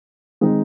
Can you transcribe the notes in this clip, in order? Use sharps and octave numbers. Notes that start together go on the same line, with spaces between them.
D#3 G#3 C4 D#4